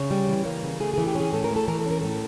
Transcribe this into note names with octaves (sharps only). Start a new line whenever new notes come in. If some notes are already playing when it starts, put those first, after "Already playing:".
Already playing: C#3 C#5
G3
E3
A#3
C#3
A3 G#4
G#4
E3
G4
C#4 G#4
A2 A4
A#4
A3 A4
E3 A#4
A4
C#4 A#4
A2 A4